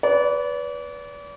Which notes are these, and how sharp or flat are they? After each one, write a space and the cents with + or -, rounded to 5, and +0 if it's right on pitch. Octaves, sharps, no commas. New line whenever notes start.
B4 +0 D5 -35